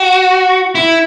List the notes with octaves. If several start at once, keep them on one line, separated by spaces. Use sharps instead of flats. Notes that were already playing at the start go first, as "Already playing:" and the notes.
Already playing: F#4
E4